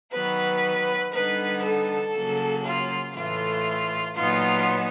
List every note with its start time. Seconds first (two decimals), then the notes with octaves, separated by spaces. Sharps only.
0.12 D#3 F#3 B3 B4
1.13 D3 G3 B3 D#4 B4
1.63 A4
2.14 C#3 F#3 A#3
2.65 F4
3.15 A2 E3 A3 F4
4.16 A#2 F#3 B3 D#4 F4